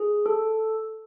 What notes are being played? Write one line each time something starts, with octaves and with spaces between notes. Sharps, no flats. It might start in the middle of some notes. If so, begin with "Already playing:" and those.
Already playing: G#4
A4